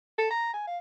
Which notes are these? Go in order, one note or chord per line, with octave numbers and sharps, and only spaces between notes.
A4
A#5
G#5
F5